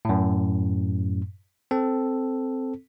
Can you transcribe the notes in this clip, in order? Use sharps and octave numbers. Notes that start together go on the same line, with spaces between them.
F#2 A2
C4 A4